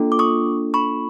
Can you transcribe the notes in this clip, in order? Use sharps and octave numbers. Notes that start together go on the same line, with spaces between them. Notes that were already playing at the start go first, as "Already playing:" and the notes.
Already playing: A#3 D4 F4 A4
D6
C#6 D#6
B5 C#6